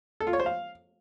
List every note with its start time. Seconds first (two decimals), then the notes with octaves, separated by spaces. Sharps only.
0.20 A4
0.27 F4
0.33 C#5
0.40 C5
0.46 F5